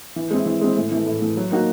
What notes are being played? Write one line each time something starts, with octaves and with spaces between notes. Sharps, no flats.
E3
G#3 C4 E4
E3
G#3 C4 E4
A2
E3 A3
A2
E3 A3
F#3
A#3 D#4 F#4